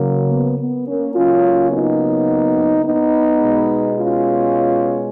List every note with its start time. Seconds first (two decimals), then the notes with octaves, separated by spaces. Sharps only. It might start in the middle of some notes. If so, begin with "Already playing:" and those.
Already playing: C#3 F#3 A#3
0.30 B3
0.59 B3
0.87 A#3 C#4
1.15 C#3 F#3 A#3 C#4 F4
1.71 B3 D#4
2.85 B3 D#4
3.40 B2 G#3
3.96 C#4 F4